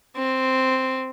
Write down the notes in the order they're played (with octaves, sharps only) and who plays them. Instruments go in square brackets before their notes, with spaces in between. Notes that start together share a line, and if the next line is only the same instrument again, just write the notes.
[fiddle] C4